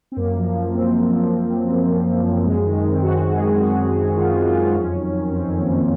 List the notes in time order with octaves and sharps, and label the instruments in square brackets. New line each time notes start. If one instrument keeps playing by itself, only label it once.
[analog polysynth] C4
F#2 A#3
F3
F3
F#2 C4
F#2
F3
F3
F#2
F#2
F3
F3
F#2
F#2 G#3
G#3
D#3
G#3
D#3
C4
F#2 F#4
F#2
G#4
D#3
D#3 F#4
F#2
F#2
D#3 F4
D#3
F4
F#2
F2 C#4
D#3
D#3
F2 C4
F2
A#3
D#3